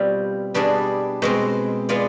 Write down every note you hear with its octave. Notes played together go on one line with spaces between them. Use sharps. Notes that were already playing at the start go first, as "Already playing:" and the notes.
Already playing: B2 G3 C4 F4
B2 G3 D4 G#4 D5
B2 G#3 C4
G#3 B3 F4 G#4 D5